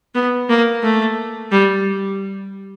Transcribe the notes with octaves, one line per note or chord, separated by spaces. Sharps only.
B3
A#3
A3
G3